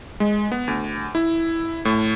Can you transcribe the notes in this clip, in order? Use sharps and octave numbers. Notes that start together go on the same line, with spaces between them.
G#3
B3
D2
E4
A2